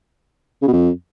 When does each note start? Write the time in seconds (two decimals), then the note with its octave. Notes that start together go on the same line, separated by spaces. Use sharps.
0.62 C#3
0.67 B2
0.73 F2